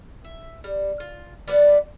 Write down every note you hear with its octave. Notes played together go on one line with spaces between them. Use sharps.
E5
G3
F4
G3 B3 D5 F#5